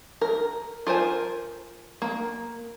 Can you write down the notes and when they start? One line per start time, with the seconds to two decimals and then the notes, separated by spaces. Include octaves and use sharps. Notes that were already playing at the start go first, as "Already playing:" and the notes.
0.21 A#4
0.87 F4 A#4 C5 G#5
2.02 A#3